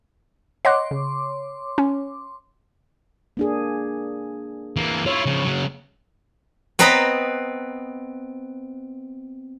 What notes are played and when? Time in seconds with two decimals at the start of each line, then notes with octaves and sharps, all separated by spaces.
0.65 C#5 D#5 F#5 C6 D6 F#6
0.91 C#3
1.78 C#4
3.37 A#3 D4 G#4
4.76 E3 A#3
5.06 E4 F4 C#5
5.26 C#3 F3
5.45 C#3 F#3
6.79 B3 C4 B4 D#5 A#5 B5